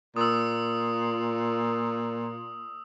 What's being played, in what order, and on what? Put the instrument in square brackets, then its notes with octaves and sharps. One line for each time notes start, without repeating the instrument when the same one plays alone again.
[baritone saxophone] A#2 [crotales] D#6 E6